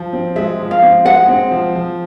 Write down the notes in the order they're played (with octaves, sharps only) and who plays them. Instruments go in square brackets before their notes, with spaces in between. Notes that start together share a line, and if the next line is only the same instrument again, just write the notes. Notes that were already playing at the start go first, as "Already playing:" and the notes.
Already playing: [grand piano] F3
C4
[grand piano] G#3 [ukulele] E5
[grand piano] F3
[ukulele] F5
[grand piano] C4
[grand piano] G#3 [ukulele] F#5
[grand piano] C4
F3
F3